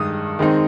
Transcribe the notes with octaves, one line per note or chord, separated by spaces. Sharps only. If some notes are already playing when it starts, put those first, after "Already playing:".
Already playing: G2 D#3 G#3 D#6
D#3 G#3 C4 D#4